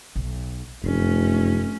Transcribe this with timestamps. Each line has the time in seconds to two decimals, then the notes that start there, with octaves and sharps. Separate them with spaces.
0.16 B1
0.84 F1 F#2 A3 C#4